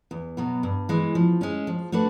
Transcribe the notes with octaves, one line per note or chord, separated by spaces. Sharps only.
E2
B2 F#3 B3
G2
E3 G#3
F3
G#3 C#4
F3
A3 D4 F#4 B4